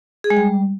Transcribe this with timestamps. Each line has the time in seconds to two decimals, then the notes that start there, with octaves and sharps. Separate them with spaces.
0.24 G#4
0.30 G#3
0.37 G3